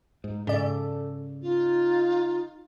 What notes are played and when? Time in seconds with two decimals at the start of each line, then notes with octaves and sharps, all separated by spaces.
0.24 G#2 D#4
0.47 G#2 C#3 A4 D5
1.42 D#4 F4